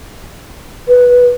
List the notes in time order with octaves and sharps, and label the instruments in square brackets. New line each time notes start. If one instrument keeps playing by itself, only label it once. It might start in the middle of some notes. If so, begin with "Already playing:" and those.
[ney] B4